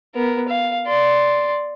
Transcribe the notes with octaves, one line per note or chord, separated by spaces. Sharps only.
B3 A#4
F5
D5 C6